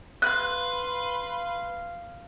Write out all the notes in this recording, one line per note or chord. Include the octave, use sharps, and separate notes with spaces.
B4 F5 C6 F#6